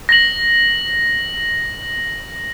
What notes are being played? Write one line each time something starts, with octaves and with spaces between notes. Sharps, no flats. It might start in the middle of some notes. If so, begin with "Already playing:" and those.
A#6 F#7